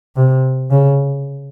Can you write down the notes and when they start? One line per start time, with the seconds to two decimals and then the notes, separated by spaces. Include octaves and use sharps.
0.16 C3
0.71 C#3